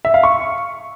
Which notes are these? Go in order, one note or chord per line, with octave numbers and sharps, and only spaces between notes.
E5
F5
C#6